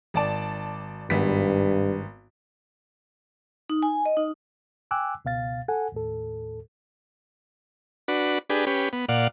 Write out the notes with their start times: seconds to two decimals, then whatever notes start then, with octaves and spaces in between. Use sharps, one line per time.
0.14 G#1 D5 A5
1.10 G#1 G2 B3 B6
3.69 D#4
3.83 G#5
4.06 D#5
4.17 D#4
4.91 G5 G#5 D6 E6 F#6
5.25 C#2 B2 F5 A6
5.68 A4 F#5 G#5
5.92 D#2 A2 A4
8.08 D4 F#4 B4
8.50 D4 G4 G#4 B4
8.67 C#4 G4 B4
8.93 B3
9.09 A#2 D5 F5 F#5